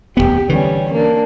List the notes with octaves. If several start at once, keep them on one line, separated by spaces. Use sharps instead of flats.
D1 G#1 B3 G4
D3 E3 G3 C#4
A#3 D4